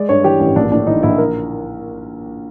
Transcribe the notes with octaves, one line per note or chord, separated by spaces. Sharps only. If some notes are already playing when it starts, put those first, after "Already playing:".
Already playing: G#3 D5
G2 C#5
E3 G4
A1 C#4
A#1 D4
A2 D4
E3 D#4
A#1 E4
A#4